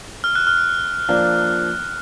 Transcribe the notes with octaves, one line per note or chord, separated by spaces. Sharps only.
F6
F#6
F6
F3 A#3 D4